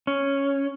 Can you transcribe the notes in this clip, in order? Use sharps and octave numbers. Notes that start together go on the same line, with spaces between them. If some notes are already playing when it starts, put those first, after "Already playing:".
C#4